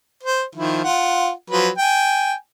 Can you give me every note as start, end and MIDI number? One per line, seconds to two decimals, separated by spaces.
0.23 0.43 72
0.56 0.83 51
0.56 0.83 53
0.56 0.83 64
0.84 1.31 65
0.84 1.31 78
1.50 1.69 53
1.50 1.69 54
1.50 1.69 71
1.78 2.33 79
1.78 2.33 80